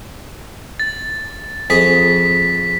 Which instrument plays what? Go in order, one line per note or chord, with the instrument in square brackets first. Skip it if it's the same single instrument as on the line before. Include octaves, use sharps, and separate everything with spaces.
[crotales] A6
[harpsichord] F2 G#4 D#5 [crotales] B6